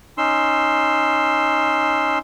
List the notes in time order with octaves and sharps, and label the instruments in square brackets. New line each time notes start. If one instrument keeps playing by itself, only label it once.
[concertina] C#4 D#4 C6 E6